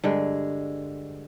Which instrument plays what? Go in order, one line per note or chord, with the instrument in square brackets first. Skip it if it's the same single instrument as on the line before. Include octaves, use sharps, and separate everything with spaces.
[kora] G2 D3 G#3